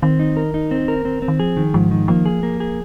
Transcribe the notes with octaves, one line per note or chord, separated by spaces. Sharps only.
D#3 C4
D#4
A#4
D#4
C4
A#4
C4
C4
D#3
F3 G#4
D#3
G#2 F3
D#3
F3 A#3
G#4
A#3
G#4